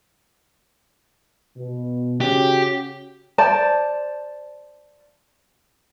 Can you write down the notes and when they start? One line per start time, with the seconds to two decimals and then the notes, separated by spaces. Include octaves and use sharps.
1.57 B2
2.21 C#3 C#4 F#4 G4
3.38 C5 D5 A5